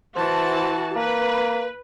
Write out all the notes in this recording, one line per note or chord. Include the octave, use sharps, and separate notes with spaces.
E3 F#4 C5 A5
A#3 B4